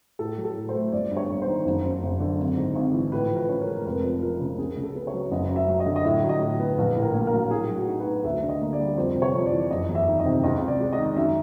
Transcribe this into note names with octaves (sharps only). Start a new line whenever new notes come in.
A2 A4
F#3
A4
A2
C5
A3
G1 D5
G2
C#5
G1
C5
D#3
F#1
F#2
F#1
D3
G#1
G#2
G#1
E3
A2 B4
F3
B4
C#4
A#4
G#3
A#4
F1 B4
F2
F3 A#4
C#3
C#2 G#4
C#3
A4
B3
C#5
F#3
F#1 D#5
F#2
E5
F#3
D#5
D3
D#5
A2 E5
F#3
D#5
A2
B3
A#1 B4
A2
A#4
A#3
A#4
F#3
A2 G#4
F#3
F#4
D#4
B4
B3
D2 E5
D3
D#5
A#3
D5
G3
F2 C5
C3
C#5
F2
D5
E3
F#1 D#5
E2
E5
D#3
D#5
C3
C#2 D#5
C3
D5
G#3
D#5
D#3
F#2 E5